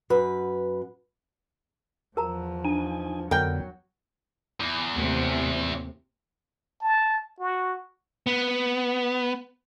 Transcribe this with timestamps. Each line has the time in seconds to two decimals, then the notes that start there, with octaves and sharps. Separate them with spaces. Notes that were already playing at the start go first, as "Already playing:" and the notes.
0.10 F#2 B4
2.17 E2 F3 A#4 A5 A#5
2.65 D4 D#4 G#5
3.31 F2 D3 F#3 B3 A#4 G5
4.60 E2
4.94 D#2 A2 C3
6.81 A5
7.39 F#4
8.27 B3